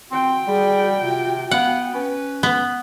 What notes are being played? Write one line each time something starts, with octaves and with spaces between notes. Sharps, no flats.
C4 F#4 G5
G3 G#4
C3 F4
B3 F5 F#5
C#4 B4
B3